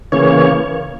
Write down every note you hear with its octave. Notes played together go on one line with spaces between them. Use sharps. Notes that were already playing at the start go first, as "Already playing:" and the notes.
C#3 E3 A#3 C#5